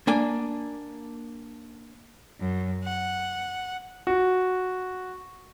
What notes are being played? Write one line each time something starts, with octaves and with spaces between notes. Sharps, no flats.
A#3 D4 G#5
F#2
F#5
F#4